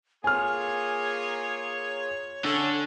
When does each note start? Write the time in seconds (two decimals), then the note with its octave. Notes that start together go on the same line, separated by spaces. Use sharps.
0.24 A#3 F4 G#4 C#5 G#5 F6
2.45 D3 C#4 A4